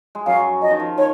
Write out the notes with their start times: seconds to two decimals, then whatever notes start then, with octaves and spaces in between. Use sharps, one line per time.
0.15 G#3
0.26 F#2 F#3 F5
0.62 F3 D#5
0.71 D#3
0.80 F3
0.98 D#3 C#5